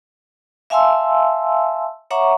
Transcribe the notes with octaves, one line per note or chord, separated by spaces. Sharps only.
E5 F5 G#5 A5 C6 E6
C#5 E5 F#5 A#5 C#6 D6